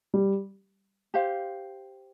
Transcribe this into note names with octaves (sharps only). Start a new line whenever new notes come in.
G3
G4 C5 F5